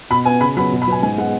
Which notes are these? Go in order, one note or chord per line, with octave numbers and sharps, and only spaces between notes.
B2 B5
B3 G#5
C#3 B5
F#3 B3 B5
B2
B5
F#3 B3 G#5
G#2 G#5
G#3 B3 F#5